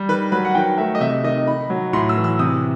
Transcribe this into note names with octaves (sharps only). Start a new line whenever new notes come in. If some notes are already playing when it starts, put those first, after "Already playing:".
Already playing: G3
D#3 B4
F#3 B4
F#5
D#3 G5
A3 E5
D#5
C3 E5
D#3 D#5
D#3 B5
F#3
A2 C6
E6
E3
E6
C3 D#6